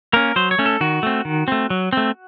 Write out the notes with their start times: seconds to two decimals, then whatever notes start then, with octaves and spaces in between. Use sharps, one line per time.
0.13 A#3 C#4 A#4
0.36 F#3 C5
0.51 C#5
0.59 A3 C#4
0.66 A4
0.81 D#3 F#4
1.03 A3 C4
1.25 D#3
1.48 A3 C4
1.70 F#3
1.93 A3 C4